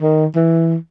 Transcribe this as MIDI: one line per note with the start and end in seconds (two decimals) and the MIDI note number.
0.01 0.25 51
0.35 0.76 52